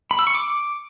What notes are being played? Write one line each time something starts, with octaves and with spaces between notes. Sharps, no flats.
B5
E6
C#6
D6